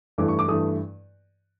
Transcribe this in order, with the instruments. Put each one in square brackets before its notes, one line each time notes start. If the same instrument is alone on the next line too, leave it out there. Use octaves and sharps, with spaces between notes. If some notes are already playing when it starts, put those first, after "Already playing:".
[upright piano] G2 E3 A3 D6
C#6
D6
G2 E3 A3 D#6